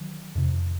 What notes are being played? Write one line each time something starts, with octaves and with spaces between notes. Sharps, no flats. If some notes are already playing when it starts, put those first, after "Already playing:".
Already playing: D#3 F#3
F2 C3